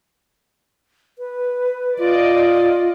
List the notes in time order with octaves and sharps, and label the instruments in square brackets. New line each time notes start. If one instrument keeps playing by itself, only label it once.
[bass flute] B4
[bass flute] F4 [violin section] D5 D#5